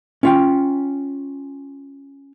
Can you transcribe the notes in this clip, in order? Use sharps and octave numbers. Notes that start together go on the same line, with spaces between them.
C#4 F4 G5